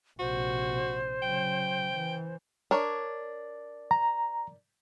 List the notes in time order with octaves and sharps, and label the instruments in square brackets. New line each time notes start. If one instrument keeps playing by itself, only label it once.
[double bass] A#1 C3 [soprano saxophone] F#4 [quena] C5
[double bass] C#3 F#3 [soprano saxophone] G5
[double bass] E3
[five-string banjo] D4 A#4 C#5
[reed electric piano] A#5